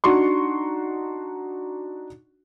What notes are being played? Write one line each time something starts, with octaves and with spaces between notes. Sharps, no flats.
D4 D#4 F#4 C6 C#6